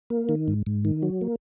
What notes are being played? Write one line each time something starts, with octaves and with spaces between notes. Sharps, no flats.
A#3
D#3
G#2
G#2
D#3
F#3
A#3